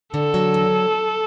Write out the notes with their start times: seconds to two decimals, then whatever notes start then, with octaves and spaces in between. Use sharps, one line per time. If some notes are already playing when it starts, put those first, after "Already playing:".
0.14 D3 A4
0.34 F#3
0.54 E2